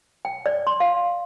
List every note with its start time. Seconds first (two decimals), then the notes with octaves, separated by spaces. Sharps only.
0.25 G5
0.46 D5
0.67 C6
0.80 F5